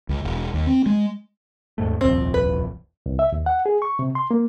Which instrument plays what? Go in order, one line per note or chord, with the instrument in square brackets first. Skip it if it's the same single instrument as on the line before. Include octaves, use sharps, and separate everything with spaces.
[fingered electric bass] C#2
E1
D#2
C4
G#3
[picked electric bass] D#2 G#2 A3
[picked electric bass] D#1 C2 F2 [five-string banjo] C4
[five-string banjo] B4
[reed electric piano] C2
E5
D#2
F#5
G#4
C#6
C3
C6
A#3